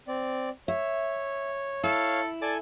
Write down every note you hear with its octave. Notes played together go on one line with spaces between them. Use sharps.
C4 D5
C#5 E5
E4 A4 C#5 F5
A4 D5 G#5